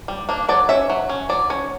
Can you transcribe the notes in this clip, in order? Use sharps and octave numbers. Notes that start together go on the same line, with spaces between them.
G3
A#3 D4
F#3 D5
C#4 E5
F#3
C#4
F#3 D5
C#4 C#5